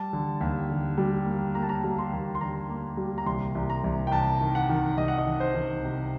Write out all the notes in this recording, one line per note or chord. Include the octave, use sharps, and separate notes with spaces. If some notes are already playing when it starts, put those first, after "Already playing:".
Already playing: G3 A5
D3
D#2
D3
G3
A#3
A#3 A#5
A5
A#5
G3
C6
D#2
C6
D3 A#5
A#3
G3
A#5
C2 C6
C2
A#5
C2
G5
C2 A5
D#3
F#5
D#3
C2 D#5
F#5
D#5
D#3
C5
D#3
C3